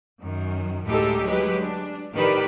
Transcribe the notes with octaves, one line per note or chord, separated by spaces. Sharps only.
F#2 D#3
D2 A2 G#3 D#4 G4 A4
F#3 G#3 G4 B4
D4
A2 D#3 G4 B4 D5